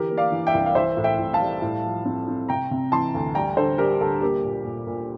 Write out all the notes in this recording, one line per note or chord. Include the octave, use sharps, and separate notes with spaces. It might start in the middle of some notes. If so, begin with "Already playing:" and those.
Already playing: D3 E3 G4 A#4
A#3
D5 F5
E3
E5 G5
C2
F5
E3 C5 E5
A2
E5 G5
A2
F5 A5
G3
A2
F3
C4
C4
C3 G5 A#5
C3
E3 A5 C6
D2
G3 G5 A#5
D3 A4 C5
G3 G4 A#4
D2 A4
A#3 G4
A#2
A#2
A#2